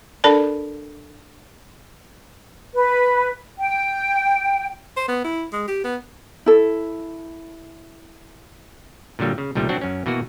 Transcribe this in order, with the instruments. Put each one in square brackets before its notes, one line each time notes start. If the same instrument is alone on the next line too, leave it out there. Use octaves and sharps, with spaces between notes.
[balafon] D4 A4 A#4 D5 A5 B5
[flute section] B4
G5
[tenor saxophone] C5
B3
E4
G#3
G4
B3
[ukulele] E4 A4
[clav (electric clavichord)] A#2 D3 F#3 G3 A#3
C#3
C2 A#2 D#3 G3 A3
F#3 C4 D4 F#4
F#2 C#4
B2 E3 A#3 F#4